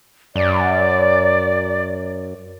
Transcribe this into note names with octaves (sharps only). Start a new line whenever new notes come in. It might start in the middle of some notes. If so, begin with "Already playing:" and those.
F#2 D5